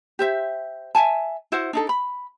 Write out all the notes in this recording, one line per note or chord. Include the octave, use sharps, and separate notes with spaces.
G4 C5 E5
E5 F#5 G#5 A5
E4 F#4 C5 F#5
D4 D#4 A4
B5